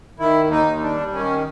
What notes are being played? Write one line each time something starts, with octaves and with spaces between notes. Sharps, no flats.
D#3 E4
D#2
D#4
D#2
D4
G3
D#3 C#4